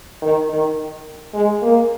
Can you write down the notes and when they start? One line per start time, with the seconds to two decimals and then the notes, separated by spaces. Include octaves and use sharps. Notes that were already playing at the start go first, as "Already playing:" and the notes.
0.22 D#3
0.50 D#3
1.34 G#3
1.62 A#3